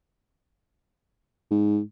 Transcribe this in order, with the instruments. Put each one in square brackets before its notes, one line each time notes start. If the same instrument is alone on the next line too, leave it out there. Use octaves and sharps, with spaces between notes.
[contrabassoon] G#2